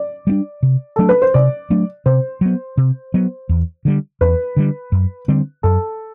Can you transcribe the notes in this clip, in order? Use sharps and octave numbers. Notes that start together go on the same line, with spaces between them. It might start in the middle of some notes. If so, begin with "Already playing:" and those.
Already playing: D5
G3 B3 D4
C3
F#3 A3 D4 A4
B4
C5
C3 D5
F#3 A3 D4
C3 C5
F#3 B3
C3
F#3 B3
E2
D3 G3
E2 B4
D3 G3
F#2
D3 G3 C4
F#2 A4